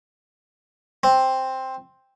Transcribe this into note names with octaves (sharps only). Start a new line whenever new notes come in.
C4